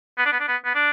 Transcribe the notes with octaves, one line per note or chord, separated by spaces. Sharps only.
B3
D4
B3
D4
B3
B3
D4